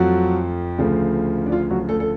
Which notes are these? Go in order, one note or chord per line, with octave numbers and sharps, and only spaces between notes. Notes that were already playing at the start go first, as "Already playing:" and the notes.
Already playing: F2 F3 F#3 A3 F#4
D2 C#3 F3 A3
D4
F4
F#3 F#4
A3 A4
A4